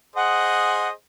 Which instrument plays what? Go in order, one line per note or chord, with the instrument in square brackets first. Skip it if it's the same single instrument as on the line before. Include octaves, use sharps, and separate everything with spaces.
[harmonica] G#4 C5 D#5 [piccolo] F#5